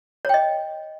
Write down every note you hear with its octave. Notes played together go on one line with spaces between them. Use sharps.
C#5 D#5 G5